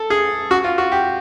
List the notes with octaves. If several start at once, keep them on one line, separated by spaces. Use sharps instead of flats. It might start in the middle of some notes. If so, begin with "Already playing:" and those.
Already playing: A4
G#4
F#4
F4
F#4
G4